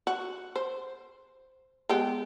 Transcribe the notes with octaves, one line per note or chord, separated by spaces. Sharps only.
F#4
C5
G#3 B3 G4